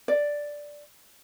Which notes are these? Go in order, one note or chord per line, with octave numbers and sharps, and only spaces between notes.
D5